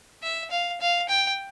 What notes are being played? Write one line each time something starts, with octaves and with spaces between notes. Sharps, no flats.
E5
F5
F5
G5